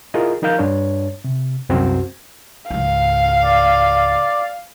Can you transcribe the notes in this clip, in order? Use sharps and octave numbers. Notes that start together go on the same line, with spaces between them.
E4 F4 G#4 A#4 D#5
F3 D#4 A#4 F5 G6
G2 D4 C#5
C3
C2 F#2 C4 F#4 C5
C#2 G#2 F5
D5